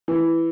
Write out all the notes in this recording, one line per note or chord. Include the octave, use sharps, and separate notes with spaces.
E3